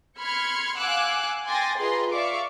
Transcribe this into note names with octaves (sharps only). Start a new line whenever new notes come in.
B5 C6 F6 G#6 C#7
F5 F#5 G#5 D6 E6 F#6
G5 G#5 C6 D6 A6 A#6
F4 G#4 B4 D#5 A#5 C6
D5 E5 F5 C#6 D6